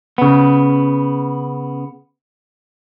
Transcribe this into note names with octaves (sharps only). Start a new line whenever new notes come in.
C#3 B3